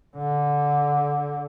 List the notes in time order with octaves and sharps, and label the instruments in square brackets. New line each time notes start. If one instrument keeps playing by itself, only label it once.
[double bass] D3